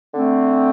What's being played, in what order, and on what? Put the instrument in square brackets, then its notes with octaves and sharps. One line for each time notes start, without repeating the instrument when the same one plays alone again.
[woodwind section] D3 A3 C4